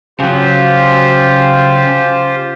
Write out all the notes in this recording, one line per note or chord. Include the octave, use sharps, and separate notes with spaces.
C#3 F#3 F4 G4 C5